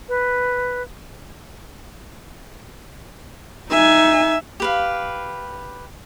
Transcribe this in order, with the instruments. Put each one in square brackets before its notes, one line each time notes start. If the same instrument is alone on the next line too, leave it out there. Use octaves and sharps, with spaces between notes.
[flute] B4
[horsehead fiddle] D#4 G#5 [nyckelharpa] E5
[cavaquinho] G4 B4 F5